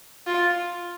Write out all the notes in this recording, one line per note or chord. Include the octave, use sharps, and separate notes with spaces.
F4